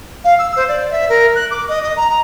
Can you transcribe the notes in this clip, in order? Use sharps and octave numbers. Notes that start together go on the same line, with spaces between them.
F5
E6
C5
D5
E5
A#4
F#6
D6
D#5
D#5
A#5
A#5